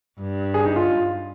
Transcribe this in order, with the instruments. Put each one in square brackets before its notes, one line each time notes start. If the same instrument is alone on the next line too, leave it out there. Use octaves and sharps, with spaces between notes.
[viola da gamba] G2
[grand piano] G#4
D#4
F4